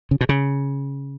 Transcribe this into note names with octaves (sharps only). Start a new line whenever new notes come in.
C#3
B2
C#3